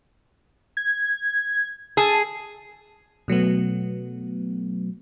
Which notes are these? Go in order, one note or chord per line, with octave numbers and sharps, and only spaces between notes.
G#6
G#4 A5
B2 F#3 A3 B3